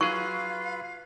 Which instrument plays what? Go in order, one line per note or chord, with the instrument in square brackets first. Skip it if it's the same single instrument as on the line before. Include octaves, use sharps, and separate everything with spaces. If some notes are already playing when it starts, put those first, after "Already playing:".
[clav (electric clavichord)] F#3 G#4 [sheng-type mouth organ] F4 B4 [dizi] F5 [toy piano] C#6